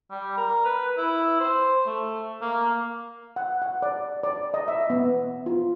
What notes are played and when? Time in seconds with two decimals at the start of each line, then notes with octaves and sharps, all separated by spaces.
0.10 G3
0.37 A#4
0.65 B4
0.97 E4
1.40 C5
1.86 A3
2.41 A#3
3.36 F#5
3.62 F#5
3.82 D5
4.23 D5
4.54 D#5
4.68 E5
4.90 B3
5.46 F4